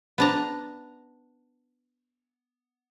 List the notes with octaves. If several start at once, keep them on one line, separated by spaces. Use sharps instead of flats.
B3 D4 A#5